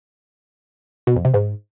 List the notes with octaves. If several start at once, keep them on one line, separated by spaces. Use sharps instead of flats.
B2
F2
C3
G#2